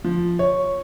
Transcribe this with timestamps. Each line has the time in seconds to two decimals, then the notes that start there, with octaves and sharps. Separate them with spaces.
0.04 F3
0.39 C#5